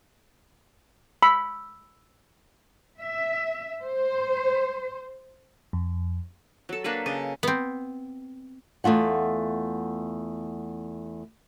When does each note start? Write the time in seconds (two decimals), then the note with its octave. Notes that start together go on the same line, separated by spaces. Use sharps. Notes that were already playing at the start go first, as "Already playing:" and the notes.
1.23 B5 E6
2.99 E5
3.82 C5
5.73 F2
6.69 F#3 A4
6.84 A#3 D4 A4 B4
7.06 C#3 D#5
7.43 B3 C4
8.84 E2 A3 F4 F#5